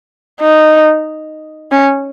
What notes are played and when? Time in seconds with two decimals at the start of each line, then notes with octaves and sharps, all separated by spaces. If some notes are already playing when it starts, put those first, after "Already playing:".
0.41 D#4
1.72 C#4